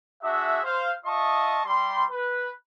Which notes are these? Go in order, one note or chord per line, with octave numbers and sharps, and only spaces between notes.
D4 F#4 G#4 E5
C5 F5
F4 D#5 E5 A5 C#6 D#6
G3 C6
B4